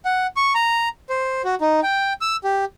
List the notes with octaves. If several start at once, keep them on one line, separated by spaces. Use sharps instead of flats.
F#5
C#6
A#5
C5
F#4
D#4
G5
E6
G4